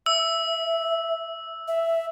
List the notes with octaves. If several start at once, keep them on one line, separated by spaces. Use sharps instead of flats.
E5 E6
E5